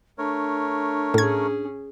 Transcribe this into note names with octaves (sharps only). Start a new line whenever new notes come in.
A3 D4 A#4 C#5
A2 C#4 G#4 G#6